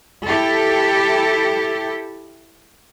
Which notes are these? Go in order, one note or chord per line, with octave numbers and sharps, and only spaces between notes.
E4 G4 A4